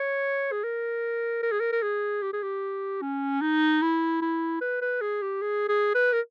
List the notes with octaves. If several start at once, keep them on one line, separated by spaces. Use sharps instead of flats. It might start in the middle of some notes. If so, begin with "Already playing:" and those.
Already playing: C#5
G#4
A#4
A#4
G#4
A#4
A#4
G#4
G4
G#4
G4
C#4
D#4
E4
E4
B4
B4
G#4
G4
G#4
G#4
B4
A#4